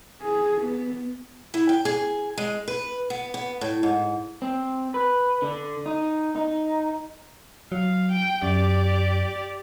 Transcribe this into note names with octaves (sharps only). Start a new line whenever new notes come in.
G#4
B3
E4
G5
G#4
G#3
B4
B3
B3
A2
G#2
C4
B4
D3
D#4
D#4
F#3 F5
G5
F#2 G4 D5